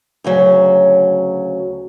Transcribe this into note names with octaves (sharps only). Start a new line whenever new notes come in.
D2 C#3 F#3